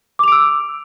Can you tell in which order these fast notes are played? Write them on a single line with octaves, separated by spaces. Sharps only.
D6 F7 D7 E6